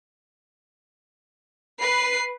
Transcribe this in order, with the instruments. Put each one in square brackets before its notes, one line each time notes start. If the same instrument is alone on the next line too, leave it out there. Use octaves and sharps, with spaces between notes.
[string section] B4 [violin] C7